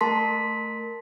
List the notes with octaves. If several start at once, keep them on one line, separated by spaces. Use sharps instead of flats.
A3 A#4 A5 C6 B6